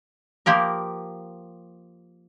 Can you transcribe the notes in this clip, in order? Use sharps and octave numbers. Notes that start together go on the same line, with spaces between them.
F3 A#3 G4 A#4